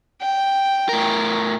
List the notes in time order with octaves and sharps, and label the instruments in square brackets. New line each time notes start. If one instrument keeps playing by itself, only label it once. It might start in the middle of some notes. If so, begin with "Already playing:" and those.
[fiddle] G5
[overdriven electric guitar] A2 A#4